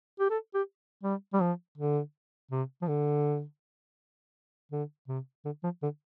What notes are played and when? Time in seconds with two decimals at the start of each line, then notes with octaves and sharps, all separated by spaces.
0.20 G4
0.30 A4
0.54 G4
1.03 G3
1.33 G3
1.41 F3
1.78 D3
2.52 C3
2.82 F3
2.88 D3
4.72 D3
5.08 C3
5.45 D3
5.64 F3
5.83 D3